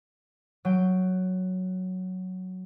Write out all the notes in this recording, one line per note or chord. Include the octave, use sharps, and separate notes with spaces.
F#3 G5